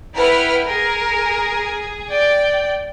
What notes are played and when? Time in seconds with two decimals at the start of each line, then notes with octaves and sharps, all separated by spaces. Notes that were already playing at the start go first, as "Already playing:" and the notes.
0.15 E4 B4 F#5 G5 F6
0.67 G#4 A#4
2.09 D5 G5